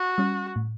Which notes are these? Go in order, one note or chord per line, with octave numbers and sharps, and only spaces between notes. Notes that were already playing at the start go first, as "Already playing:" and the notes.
Already playing: F#4
G3 C#4
A2